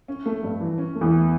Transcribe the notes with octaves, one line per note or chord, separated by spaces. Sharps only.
C#4
A3
G2
E3
C#4
A3
E2 E3